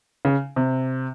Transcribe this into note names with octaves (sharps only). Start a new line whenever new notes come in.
C#3
C3